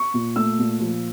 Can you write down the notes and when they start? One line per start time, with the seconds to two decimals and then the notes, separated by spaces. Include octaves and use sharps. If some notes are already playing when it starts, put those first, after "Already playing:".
Already playing: C#6
0.14 A#2
0.36 A3 E6
0.59 A#2
0.80 F3